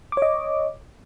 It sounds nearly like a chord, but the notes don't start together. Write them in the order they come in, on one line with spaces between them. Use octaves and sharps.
D6 C#5 D#5